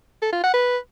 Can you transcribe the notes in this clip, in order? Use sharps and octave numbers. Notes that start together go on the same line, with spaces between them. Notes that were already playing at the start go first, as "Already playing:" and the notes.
A4
F4
F#5
B4